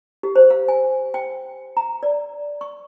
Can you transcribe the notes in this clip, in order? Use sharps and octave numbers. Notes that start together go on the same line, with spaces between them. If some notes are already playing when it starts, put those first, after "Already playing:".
G4
C5
F5
G#5
G5
A#5
D5
C#6